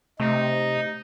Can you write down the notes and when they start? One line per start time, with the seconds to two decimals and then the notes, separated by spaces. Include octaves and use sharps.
0.20 C3 A3 D#4